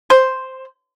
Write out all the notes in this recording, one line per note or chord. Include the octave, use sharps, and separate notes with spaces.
C5